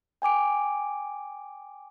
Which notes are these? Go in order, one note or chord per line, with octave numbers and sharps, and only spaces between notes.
G5 G#5 D6 D7